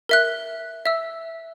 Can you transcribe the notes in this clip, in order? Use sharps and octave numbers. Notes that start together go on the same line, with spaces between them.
A#4 E5 F#6
E5 E6